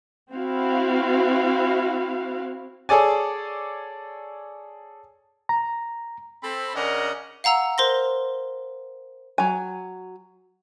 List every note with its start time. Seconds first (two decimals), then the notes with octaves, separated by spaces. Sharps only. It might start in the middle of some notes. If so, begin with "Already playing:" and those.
0.33 C4 E4 F#4 F5
2.89 G#4 A4 C#5 D5 G#5
5.49 A#5
6.43 C4 A4 B5
6.75 C#3 C#4 D4 A#4 D#5 F#5
7.44 F5 F#5 A#5 E6 F7
7.78 A#4 C5 C6 A#6
9.38 F#3 G#5